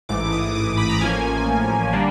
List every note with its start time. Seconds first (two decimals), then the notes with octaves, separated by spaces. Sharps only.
0.09 A1 G#2 E3 A3 D6
0.32 D#6
0.55 D6
0.77 B5
0.89 A#5
1.01 A1 A2 F3 A#3 C#4 G#5
1.93 D3 G3 A#3 D4